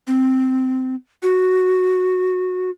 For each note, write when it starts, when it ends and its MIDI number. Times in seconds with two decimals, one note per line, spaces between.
0.07 0.95 60
1.23 2.70 66